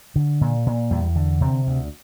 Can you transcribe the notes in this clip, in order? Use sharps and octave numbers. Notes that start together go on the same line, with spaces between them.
D3
A#2
A#2
E2 G3
D3
C3 C4
D2